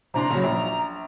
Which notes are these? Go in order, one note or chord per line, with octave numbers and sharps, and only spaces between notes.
C3 D4 A#5 C6
C#3 F#3
A#1